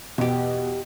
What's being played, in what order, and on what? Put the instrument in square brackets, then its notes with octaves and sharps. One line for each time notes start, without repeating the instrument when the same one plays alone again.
[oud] E2 G4 [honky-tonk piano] B2